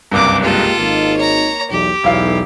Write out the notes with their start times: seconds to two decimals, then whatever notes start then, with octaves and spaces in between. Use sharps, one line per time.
0.12 F#1 C2 G2 A#3 D6
0.42 G#3 A#3 F4 G4 A4
0.78 G#1 A#3 D#4
1.17 C#5 A#5
1.70 B1 E2 G4
2.03 E1 B1 E4 F5